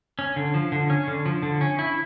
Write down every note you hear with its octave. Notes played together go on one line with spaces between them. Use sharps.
C#4
D3
F3
D3
C#4
D3
F3
D3
C#4
E4